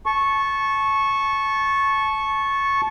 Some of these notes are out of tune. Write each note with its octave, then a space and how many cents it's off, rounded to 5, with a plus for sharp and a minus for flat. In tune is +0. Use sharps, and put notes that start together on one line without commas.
A5 -20 C#6 -10